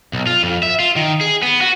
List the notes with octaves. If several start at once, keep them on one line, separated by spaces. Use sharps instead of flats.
B1
F4
F2
E5
F4
D#3
G#4
B3
F#4